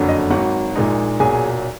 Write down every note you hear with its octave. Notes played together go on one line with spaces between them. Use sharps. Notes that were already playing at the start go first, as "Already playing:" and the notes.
Already playing: F#1 F2 D3 F#3
D#5
G#1 G#2 F#3 F#4 F#5
A#1 A#2 G#3 D#4
B1 A#2 F#3 G#4 G#5